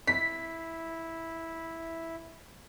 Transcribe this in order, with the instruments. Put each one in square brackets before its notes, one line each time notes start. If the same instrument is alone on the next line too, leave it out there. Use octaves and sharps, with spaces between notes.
[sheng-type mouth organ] E4 [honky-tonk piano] B6